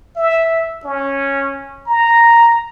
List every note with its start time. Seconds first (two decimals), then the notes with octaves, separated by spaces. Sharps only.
0.16 E5
0.84 C#4
1.87 A#5